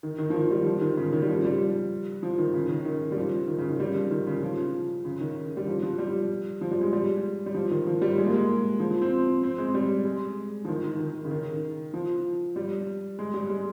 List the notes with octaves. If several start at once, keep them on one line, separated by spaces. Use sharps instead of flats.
D#3
D#3
F3
D#3
G3
F3
D#3
C#3
D#3
G3
F3
G3
F3
D#3
C#3
D#3
D#3
G3
F3
D#3
C#3
D#3
G3
F3
D#3
C#3
F3
C#3
D#3
G3
F3
F3
G3
F3
G3
G#3
G3
G3
F3
D#3
F3
G3
G#3
A#3
G#3
F3
F3
C4
C4
G#3
G3
G#3
F3
D#3
D#3
D#3
C#3
D#3
F3
G3
G#3
G3
G#3